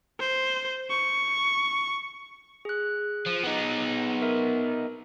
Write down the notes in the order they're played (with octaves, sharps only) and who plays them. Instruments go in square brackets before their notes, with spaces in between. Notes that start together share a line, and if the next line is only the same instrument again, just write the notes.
[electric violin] C5
C#6
[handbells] G#4 F#6
[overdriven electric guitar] F3
B3 D#4
[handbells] A#4 E5